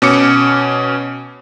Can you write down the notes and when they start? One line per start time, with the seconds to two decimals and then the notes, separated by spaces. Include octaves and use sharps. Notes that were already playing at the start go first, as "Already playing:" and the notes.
0.02 B2 C#4 D6 C#7